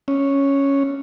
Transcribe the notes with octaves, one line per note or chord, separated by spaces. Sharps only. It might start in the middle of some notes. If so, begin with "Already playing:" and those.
C#4